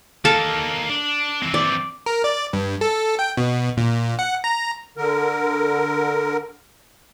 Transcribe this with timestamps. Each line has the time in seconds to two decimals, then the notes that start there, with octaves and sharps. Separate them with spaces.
0.25 A#3 D#4 A4 F5 A5
0.89 D4
1.43 E3 C4
1.54 D5
2.06 A#4
2.24 D5
2.53 G2
2.81 A4
3.19 G5
3.37 B2
3.77 A#2
4.19 F#5
4.44 A#5
4.97 D3 A#4